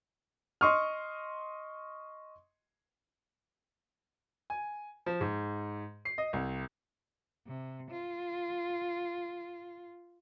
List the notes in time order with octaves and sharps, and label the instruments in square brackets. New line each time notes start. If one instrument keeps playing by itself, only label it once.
[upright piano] D#5 C6 C#6 D#6 F6
[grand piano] G#5
F3
G#2
C7
D#5
C2
[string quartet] C3
F4